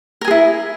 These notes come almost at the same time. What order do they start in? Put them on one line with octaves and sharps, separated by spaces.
A#4 G#5 G#4 E4